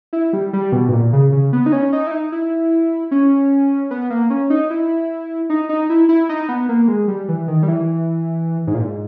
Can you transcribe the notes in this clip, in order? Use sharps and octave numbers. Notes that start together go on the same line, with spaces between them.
E4
G3
G3
B2
G#2
A#2
C#3
C#3
B3
D#4
C#4
D#4
E4
D#4
E4
C#4
B3
A#3
C#4
D#4
E4
D#4
D#4
E4
E4
D#4
B3
A#3
G#3
G3
E3
D#3
G3
E3
G#2
A#2
G#2